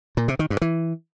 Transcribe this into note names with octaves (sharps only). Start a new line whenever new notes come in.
A#2
C3
D#3
G2
E3